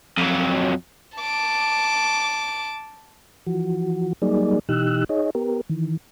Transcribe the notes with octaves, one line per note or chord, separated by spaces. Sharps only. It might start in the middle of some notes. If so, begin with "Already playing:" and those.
F2 F#3
A5 D6
E3 F3 F#4
F#3 G3 A#3 D#4 G#4 D5
B2 E3 D#4 G4 E6 F#6
D#4 G#4 C#5 D#5
B3 G4 A#4
D#3 E3